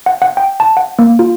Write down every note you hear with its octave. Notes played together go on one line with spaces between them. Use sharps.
F#5
F#5
G5
A5
F#5
A#3
F4